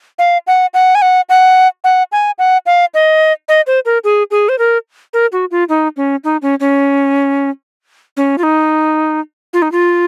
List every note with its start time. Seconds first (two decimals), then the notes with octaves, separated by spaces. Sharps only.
0.19 F5
0.47 F#5
0.74 F#5
0.95 G#5
1.02 F#5
1.29 F#5
1.84 F#5
2.12 G#5
2.39 F#5
2.66 F5
2.94 D#5
3.48 D#5
3.67 C5
3.85 A#4
4.04 G#4
4.31 G#4
4.49 C5
4.59 A#4
5.13 A#4
5.32 F#4
5.51 F4
5.69 D#4
5.97 C#4
6.24 D#4
6.42 C#4
6.60 C#4
8.17 C#4
8.38 F4
8.43 D#4
9.53 F4
9.62 D#4
9.72 F4